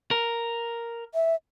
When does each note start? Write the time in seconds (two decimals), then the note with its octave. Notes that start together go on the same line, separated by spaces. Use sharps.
0.11 A#4
1.14 E5